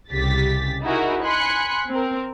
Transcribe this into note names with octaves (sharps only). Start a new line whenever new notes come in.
C2 C#3 G4 A6 B6
D#4 E4 F#4 G#4 A#4
G#5 B5 C6 F#6 C#7
C4 A#4